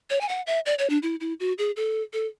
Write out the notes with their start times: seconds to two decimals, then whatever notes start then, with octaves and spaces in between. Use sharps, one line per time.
0.10 C#5
0.21 G#5
0.29 F#5
0.47 E5
0.66 D5
0.79 C#5
0.90 D4
1.03 E4
1.21 E4
1.40 F#4
1.58 G#4
1.76 A4
2.13 A4